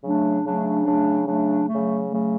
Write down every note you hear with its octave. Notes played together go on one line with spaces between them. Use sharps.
C#3 F#3 A3 D4
C#3 F#3 A3 D4
C#3 F#3 A3 D4
C#3 F#3 A3 D4
C#3 F#3 A3
C#3 F#3 A3